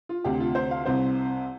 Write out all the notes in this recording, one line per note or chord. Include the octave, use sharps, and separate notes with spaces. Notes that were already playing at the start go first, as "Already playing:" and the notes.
F4
D2 C3 G4
F4
C5
F5
C2 C3 C5